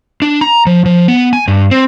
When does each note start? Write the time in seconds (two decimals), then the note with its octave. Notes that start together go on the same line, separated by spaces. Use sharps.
0.22 D4
0.41 A#5
0.66 F3
0.86 F3
1.08 B3
1.33 G#5
1.48 G2
1.71 C4